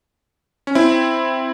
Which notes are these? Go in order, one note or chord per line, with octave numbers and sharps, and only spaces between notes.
C#4
C4 E4